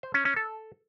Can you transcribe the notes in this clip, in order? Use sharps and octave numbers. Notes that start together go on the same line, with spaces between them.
C5
C#4
C#4
A4